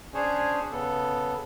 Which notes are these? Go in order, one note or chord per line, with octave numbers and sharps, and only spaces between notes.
C#4 D4 G#4 C5 C#5
C#3 B3 A4